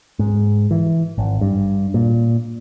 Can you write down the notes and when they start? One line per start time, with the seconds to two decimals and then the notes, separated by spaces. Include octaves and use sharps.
0.19 G#2
0.71 E3
1.18 G#1
1.41 G2
1.94 A#2